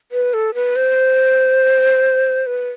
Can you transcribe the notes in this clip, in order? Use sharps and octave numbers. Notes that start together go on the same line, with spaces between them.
B4
A4
B4
C5
B4